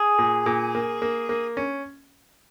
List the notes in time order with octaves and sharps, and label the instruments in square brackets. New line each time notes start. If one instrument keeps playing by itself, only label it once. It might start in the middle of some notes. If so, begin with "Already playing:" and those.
Already playing: [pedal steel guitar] G#4
[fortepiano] A#2
A#2
A#3
A#3
A#3
C#4